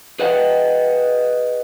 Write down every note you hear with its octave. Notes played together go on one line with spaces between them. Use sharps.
G#4 B4 D#5 F#5 G5